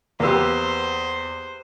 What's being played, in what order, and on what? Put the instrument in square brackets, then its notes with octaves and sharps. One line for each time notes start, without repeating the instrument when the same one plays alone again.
[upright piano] E2 E6 [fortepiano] A#3 B3 G4 [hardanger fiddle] C5